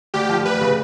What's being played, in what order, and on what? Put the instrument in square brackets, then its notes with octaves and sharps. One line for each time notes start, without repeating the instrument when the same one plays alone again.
[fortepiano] D2 [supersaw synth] G4
[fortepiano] F3
[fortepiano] D2 [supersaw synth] B4
[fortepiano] C#3